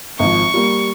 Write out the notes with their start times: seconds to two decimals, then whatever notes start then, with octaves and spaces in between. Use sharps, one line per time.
0.19 G#1 F3 C#6
0.54 G3 A#3